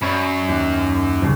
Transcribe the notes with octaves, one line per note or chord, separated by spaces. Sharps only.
F#2 C#5 D5 B5
D#2
D#1 C#3